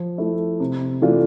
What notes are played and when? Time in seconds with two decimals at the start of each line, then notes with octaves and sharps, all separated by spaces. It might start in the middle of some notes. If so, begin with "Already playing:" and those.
Already playing: F3
0.18 A3 E4
0.60 C3
1.02 E3 A3 D4 F4